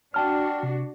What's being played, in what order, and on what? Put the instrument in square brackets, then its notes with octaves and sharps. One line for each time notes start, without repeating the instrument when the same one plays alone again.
[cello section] D4 F#4 [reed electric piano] G5 A5 F6
[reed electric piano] C3